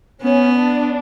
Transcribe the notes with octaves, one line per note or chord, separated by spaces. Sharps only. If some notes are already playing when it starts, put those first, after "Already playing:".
B3 C#4
D4